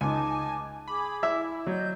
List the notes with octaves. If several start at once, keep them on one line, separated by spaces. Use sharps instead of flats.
C#2 D#4 G#5 A5 D6
G#4 B5 D6
E4 E5 E6
F#3 D5 D#5 G6